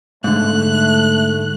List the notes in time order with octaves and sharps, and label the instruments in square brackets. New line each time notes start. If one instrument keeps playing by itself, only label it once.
[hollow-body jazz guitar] G#2 D3 [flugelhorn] A3 [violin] F#6